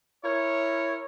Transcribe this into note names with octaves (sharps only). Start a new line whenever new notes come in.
E4 A#4 C#5